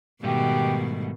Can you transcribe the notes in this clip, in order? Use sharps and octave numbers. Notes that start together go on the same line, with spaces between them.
G#2 B2 D#3 G3 A3 G4